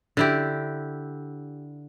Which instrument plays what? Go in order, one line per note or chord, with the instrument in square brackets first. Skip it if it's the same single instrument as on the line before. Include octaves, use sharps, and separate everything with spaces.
[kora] D3 E4 G4